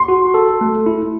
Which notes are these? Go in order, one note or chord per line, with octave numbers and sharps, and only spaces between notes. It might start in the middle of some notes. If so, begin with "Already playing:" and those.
Already playing: C6
F#4
A4
A3
E4